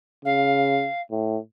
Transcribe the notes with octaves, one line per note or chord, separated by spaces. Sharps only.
C#3 F5
A2